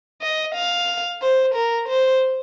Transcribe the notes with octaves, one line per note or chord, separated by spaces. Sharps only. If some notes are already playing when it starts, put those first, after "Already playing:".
D#5
F5
C5
A#4
C5